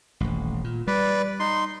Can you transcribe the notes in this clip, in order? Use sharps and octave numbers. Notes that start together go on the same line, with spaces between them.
D#1 A1
A#2
G3 B4 D5
D#4 C6